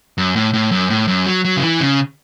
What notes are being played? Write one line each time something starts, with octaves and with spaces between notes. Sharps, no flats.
F#2
A2
A2
F#2
A2
F#2
F#3
F#3
C#3
E3
C#3